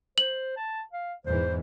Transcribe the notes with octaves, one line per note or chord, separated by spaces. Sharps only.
C5 F#7
A5
F5
E2 G#2 E3 C5